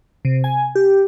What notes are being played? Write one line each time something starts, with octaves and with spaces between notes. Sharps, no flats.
C3
G#5
G4